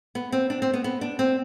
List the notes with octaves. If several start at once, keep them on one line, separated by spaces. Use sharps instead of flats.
B3
C4
D4
C4
B3
B3
D4
C4